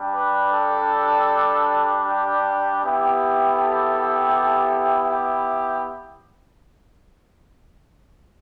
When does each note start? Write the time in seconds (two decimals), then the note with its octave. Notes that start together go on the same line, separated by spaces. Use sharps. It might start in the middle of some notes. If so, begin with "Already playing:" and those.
Already playing: G3 D4 G4
0.15 B4
0.53 A4
2.05 G4
2.82 B3 E4 G4
3.57 A4
5.10 G4